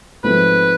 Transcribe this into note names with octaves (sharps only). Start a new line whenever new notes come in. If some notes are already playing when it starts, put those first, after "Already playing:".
G#2 F3 A3 C4 B4